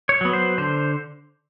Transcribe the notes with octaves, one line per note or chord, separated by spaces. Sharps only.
C#5
F#3 B3
C5
D3 C5